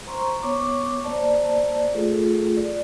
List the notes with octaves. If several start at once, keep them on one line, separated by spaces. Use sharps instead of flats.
C5 A#5 C6 C#6
B3 C#5 C#6 D6
A#3 C5 D5 A5
A3 F4 G#4 A4
D5